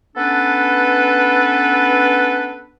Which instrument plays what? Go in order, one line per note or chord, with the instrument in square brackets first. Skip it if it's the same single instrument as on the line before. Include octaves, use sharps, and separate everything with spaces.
[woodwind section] B3 C#4 D4 A4 B4